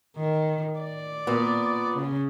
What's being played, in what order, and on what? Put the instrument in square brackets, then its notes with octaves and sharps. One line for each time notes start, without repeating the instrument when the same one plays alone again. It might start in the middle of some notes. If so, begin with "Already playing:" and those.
[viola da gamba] D#3
D5
[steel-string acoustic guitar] A#2 B3
[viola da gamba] C#3